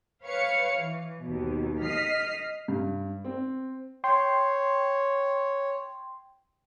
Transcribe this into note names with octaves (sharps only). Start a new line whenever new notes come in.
B4 C#5 F5 C#7
E3
D#2 B2
D#5 F6 B6 C7
G2
C4
C#5 G5 C6